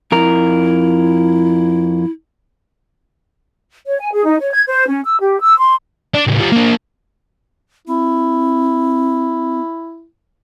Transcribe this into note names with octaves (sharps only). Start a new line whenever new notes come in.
F2 E4 A#4
C#5
G#5
G#4
D#4
C#5
G#6
C5
C#4
E6
G4
E6
C6
D4
C#2 A2
G3 F4
A#3 D4
C4 E4